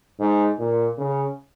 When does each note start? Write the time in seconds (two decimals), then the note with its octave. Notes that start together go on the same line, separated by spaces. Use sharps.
0.19 G#2
0.58 A#2
0.98 C#3